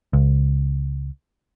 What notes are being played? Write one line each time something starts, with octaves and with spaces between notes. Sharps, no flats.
C#2